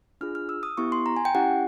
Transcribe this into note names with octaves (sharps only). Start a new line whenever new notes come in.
D4 F4 G#4 F6
F6
E6
D#6
B3 E4 G4 C#6
C6
A#5
G#5
G5
C#4 E4 G4 F#5